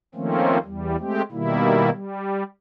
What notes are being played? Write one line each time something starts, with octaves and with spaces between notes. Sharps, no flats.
D#3 F3 A3 A#3 C4 C#4
E2 G3
G#3 A3 C4 G4
B2 D#3 G3 A#3 E4
G3